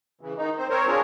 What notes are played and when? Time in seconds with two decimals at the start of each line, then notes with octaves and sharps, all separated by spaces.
0.21 C#3 E3
0.37 D#3 D#4
0.58 C4 C5
0.70 C4 A#4 C5 C#5
0.87 C4 D4 F4 G#4 A#4 C#5